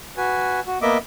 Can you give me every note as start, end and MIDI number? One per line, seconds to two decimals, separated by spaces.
0.17 0.60 66
0.17 0.60 71
0.17 0.60 80
0.67 0.78 66
0.82 0.98 58
0.82 0.98 59
0.82 0.98 75
0.82 0.98 76
0.82 0.98 86